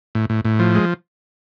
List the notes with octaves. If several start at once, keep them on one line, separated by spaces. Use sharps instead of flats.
A2
A2
A2
F3
G#3